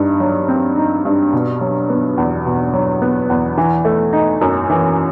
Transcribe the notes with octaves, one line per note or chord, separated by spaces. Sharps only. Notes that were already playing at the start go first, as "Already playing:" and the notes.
Already playing: G2 D#4
F#3
C4
D#4
G2
B2
F#3
B3
E2
B2
F#3
B3
E2
E3
A3
D#4
F#2
E3